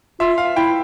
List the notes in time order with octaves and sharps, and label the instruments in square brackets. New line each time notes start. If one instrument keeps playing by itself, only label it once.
[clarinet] F4 [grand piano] E5
[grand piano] F5
[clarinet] E4 [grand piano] G5